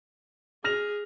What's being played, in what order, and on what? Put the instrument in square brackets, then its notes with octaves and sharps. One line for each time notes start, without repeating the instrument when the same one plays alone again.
[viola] G#4 [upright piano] F6 A#6 F7